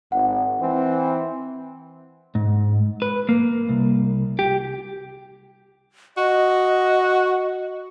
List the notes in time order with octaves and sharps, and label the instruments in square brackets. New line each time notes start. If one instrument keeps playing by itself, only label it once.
[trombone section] G#1 [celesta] F#5
[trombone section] E3 C4
[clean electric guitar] G#2
B4
A#3
C2
G4
[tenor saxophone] F#4 [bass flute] D#5